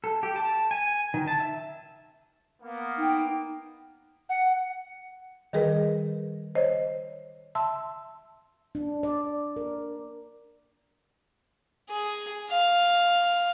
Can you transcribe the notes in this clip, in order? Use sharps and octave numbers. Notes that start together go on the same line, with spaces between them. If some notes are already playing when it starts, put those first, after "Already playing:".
A4
G4
A5
G#5
D#3
A5
E5
A#3 B3
D#4 G5
F#5
D#3 G3 G#4 A#4 B4 D#5
C5 C#5 D#5
E5 A5 C6 E6
D4
D5
A#4
G#4
F5